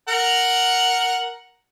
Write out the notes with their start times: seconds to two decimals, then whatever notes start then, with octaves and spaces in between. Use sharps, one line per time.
0.08 A#4 F#5 A#5